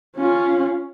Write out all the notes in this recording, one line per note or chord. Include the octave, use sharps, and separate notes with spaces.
C#4 F4